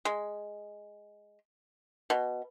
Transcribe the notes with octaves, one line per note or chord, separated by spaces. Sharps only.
G#3
B2